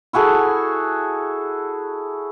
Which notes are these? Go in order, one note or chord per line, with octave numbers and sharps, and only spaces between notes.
E4 F#4 G#4 A4